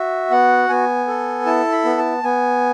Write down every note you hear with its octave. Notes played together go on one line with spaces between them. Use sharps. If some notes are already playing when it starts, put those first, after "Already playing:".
Already playing: F#4 E5
B3 F#5
B3 G#5
A4
E4 A5
B5
B3
A5
B3 G#5